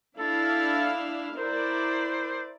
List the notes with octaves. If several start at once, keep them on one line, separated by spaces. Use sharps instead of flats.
D4 E4 A4 F5
E4 A#4 C5 D5